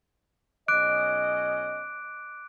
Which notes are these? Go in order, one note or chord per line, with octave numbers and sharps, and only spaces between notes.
B1 C#4 D#5 D6 F#6 D7